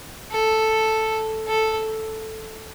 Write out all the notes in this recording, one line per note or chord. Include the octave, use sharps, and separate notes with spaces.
A4
A4